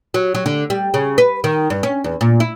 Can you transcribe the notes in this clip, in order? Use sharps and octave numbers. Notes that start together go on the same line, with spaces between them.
F#3
F#3
D3
G3
C#3
B4
D#3
G2
C#4
E2
A#2
E4